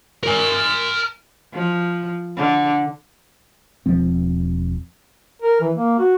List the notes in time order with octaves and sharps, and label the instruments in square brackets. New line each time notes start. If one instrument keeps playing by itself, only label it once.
[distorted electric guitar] A#4 G#5
[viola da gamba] F3
D3
[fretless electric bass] E1 F3 C4
[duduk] A#4
E3
A#3
F#4